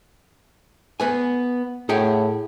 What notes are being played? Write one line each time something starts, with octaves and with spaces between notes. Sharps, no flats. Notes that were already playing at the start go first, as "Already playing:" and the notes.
B3 B4 G#5
A2 G#4 F#5 G5